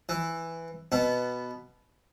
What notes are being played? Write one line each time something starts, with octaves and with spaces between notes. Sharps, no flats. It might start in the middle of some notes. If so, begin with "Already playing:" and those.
E3
B2 B3